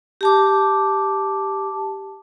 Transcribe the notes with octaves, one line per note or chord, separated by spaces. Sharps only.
G4 A5 D6